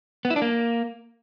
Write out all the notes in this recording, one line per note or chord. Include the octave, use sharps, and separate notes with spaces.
B3
E4
D4
A#3